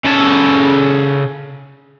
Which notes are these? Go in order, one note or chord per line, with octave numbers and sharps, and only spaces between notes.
C#3 A4